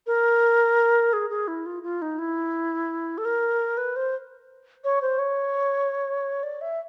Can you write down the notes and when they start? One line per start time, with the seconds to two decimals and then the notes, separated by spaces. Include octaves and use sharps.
0.07 A#4
1.13 G#4
1.30 G#4
1.48 E4
1.66 F4
1.83 F4
2.02 D#4
2.19 E4
3.18 A4
3.25 A#4
3.77 B4
3.96 C5
4.84 C#5
5.02 C5
5.19 C#5
6.43 D5
6.61 E5